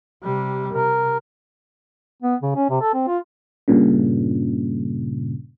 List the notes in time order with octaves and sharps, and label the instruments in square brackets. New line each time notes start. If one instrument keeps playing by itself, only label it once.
[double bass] C3 G3
[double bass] C3 [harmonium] A#4
[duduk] B3
C#3
C#4
C3
A4
C4
F4
[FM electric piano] G2 A#2 C#3